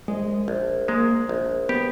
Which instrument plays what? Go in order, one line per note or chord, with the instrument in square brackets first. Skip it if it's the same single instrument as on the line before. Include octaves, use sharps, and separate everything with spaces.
[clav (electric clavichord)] A#1 [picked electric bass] G#3
[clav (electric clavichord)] A#1
[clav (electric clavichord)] G#3 [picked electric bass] A#3
[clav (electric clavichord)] A#1
[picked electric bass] B3 [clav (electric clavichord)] G4